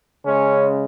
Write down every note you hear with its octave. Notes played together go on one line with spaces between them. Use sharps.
C#3 G#3 C#4